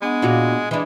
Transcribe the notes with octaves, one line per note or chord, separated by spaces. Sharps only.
G#3 B3 D4 F#5
A#2 F4 F#4
E3 G#3 D4